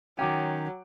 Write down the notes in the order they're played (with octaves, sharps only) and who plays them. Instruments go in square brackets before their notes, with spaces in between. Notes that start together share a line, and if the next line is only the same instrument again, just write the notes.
[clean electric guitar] D#3 C#4 [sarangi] F#3 [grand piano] G5 D6